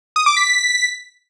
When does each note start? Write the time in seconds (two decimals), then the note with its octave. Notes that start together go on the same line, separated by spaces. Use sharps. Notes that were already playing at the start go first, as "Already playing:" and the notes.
0.16 D#6
0.26 D6
0.37 B6